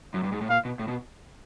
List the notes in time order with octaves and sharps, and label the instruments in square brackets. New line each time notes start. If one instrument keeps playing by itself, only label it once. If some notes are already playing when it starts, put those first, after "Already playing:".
[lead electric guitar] F#2
G2
G#2
A2
[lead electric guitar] A#2 [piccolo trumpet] F5
[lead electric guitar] B2
A2
B2